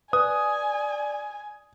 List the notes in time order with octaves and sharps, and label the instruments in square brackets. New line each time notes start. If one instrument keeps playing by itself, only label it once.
[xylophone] B4 [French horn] D5 [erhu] G#5 [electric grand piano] D#6